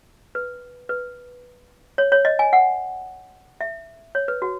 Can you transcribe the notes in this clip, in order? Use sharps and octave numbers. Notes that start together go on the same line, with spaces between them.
B4
B4
C#5
C#5
D#5
G#5
F#5
E5
C#5
B4
F#4